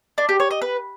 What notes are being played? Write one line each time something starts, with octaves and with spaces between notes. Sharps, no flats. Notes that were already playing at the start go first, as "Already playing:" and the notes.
D4
G4
C#5
D#5
B4